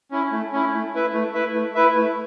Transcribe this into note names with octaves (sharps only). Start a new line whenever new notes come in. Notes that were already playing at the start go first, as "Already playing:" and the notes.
C#4 E4
A3
C#4 E4
A3
E4 B4 E5
A3
E4 B4 E5
A3
E4 B4 E5
A3